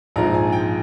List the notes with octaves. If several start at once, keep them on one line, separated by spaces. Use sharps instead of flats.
A#1 G#2 F3 A#5
G#5
G5